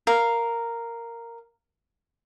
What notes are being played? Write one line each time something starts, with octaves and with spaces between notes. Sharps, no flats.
A#4 F5